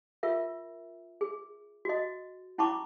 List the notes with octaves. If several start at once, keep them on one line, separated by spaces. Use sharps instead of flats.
F4 A#4 E5
G#4
F#4 D#5
C#4 E4 A5 B5 C#6 D6